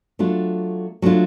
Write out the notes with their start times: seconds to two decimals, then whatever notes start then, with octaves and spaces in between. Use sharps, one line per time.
0.19 F#3 A3 D4 F4
1.02 F#3 A3 D4 F4